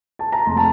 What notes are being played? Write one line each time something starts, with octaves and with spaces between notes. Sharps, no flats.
A5
A#5
F1 C6
A5